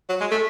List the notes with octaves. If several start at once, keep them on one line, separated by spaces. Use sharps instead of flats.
F#3
G#3
A3